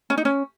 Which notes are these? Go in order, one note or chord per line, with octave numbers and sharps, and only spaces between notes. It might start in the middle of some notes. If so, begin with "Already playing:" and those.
C#4
D#4
C#4